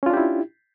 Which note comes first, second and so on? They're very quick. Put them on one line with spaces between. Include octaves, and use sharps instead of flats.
C#4 F4 D4 G4 E4